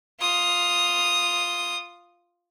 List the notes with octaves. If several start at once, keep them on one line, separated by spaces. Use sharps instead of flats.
F4 D#6